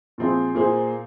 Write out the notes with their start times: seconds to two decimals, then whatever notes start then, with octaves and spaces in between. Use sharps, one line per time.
0.18 A#2 F3 C4 G#4 C5
0.55 A#2 A#3 G#4 C5